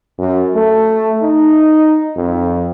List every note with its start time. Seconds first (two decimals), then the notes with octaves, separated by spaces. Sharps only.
0.19 F#2
0.55 A3
1.23 D#4
2.17 F2